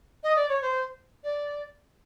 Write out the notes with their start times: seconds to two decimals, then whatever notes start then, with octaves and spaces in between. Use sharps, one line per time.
0.23 D#5
0.36 D5
0.49 C#5
0.62 C5
1.24 D5